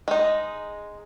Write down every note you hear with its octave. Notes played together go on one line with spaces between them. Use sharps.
G#3 D#4